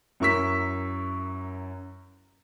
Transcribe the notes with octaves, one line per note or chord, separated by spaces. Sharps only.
F#2 E4 A#4 C#6 E6 B6